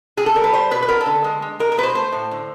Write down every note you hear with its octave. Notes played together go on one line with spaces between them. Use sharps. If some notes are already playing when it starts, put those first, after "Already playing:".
C3 G#4
A4
G3 A#4
B4
G3 C5
B2 B4
B4
B3 A#4
A4
D3
G#3
G#3
G#3 A#4
A#4
B2 B4
C5
A3 C5
A2
D3